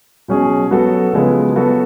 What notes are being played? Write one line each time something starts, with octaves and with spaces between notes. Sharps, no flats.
B2 F#3 C#4 G#4
F#3 B3 F#4 A4
C#3 F3 G#3 B3
F#3 B3 F#4 A4